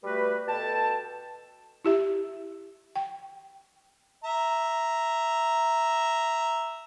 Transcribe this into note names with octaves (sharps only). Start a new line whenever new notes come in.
G3 A3 F#4 B4
B2 A4 G5 A5
E4 G4 E5
G5
E5 A#5